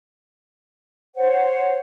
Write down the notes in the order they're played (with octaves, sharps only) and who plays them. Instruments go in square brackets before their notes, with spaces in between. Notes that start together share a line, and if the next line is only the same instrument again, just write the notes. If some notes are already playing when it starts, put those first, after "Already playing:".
[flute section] C5 C#5 F#5